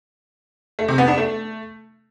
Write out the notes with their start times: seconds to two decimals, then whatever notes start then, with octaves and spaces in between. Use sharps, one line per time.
0.79 A3
0.88 C3
0.98 B3
1.08 D4
1.18 A3